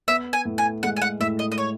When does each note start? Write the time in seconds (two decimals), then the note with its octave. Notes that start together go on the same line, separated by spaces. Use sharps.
0.08 B3 E5
0.33 G#5
0.45 A2
0.58 G#5
0.83 G#3 F#5
0.96 G#5
1.02 F#5
1.20 A2 E5
1.39 D#5
1.52 D#5
1.58 C#5